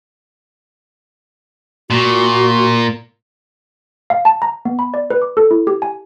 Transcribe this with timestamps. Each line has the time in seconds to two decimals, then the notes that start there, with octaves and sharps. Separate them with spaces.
1.90 A#2 F#4
4.10 F5
4.25 A5
4.42 A#5
4.65 B3
4.79 B5
4.94 D5
5.10 B4
5.22 D6
5.37 A4
5.51 E4
5.67 G4
5.82 G#5